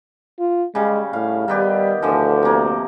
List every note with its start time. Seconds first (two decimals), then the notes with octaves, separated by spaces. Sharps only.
0.39 F4
0.75 C#3 G3 G#3
1.13 A2 F5
1.48 D#3 G3 B3 G4
2.03 D2 D3 E3 F3
2.43 C3 A#3